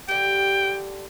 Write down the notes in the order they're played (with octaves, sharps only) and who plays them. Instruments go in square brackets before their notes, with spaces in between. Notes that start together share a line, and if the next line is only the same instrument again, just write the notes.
[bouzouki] D3 G4 [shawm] G5